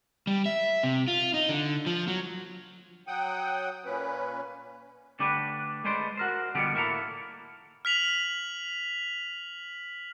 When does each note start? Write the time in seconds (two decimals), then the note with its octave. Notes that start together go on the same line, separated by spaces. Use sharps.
0.27 G3
0.46 E5
0.83 C3
1.08 F4
1.34 D#4
1.49 D3
1.86 F3
2.08 F#3
3.07 F#3 F#5 G5 D#6
3.85 A#2 C#4 B4
5.19 D3 A3 D4 G4 B4
5.84 G#3 A3 B4 C5 D5 C6
6.17 F#4 A#4 C5
6.55 B2 D3 F3 G3 B3 G4
6.74 A2 A#3 C4 E4 A4 A#5
7.85 F6 B6 F7 F#7